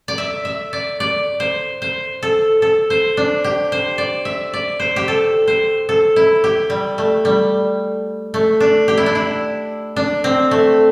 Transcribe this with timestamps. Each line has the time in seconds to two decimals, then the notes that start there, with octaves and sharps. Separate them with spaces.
0.08 D5
0.18 E5
0.45 E5
0.73 D5
1.00 D5
1.40 C5
1.82 C5
2.23 A4
2.62 A4
2.90 C5
3.17 D4
3.44 G4
3.72 C5
3.98 D5
4.25 E5
4.53 D5
4.80 C5
4.96 G4
5.08 A4
5.47 C5
5.89 A4
6.16 E4
6.44 G4
6.70 G3
6.98 A3
7.25 G3
8.34 A3
8.60 D4
8.88 G4
8.98 E4
9.06 D4
9.15 E4
9.96 D4
10.24 C4
10.51 A3